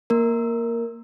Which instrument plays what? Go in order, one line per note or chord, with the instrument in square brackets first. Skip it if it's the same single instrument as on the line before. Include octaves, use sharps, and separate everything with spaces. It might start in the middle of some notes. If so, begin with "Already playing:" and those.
[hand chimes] A#3 A#4